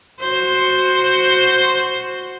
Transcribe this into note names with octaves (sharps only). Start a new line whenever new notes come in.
F#4 C5